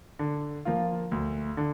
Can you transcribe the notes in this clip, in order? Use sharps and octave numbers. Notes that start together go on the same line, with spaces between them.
D3
F3 A#3 F4
D2
D3